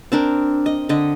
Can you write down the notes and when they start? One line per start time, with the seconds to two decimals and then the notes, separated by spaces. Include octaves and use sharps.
0.12 C4 D4 A#4
0.66 D#5
0.89 D3 D#5